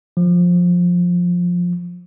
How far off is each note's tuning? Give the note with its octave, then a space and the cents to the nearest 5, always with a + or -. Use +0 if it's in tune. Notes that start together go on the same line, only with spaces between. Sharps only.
F3 +15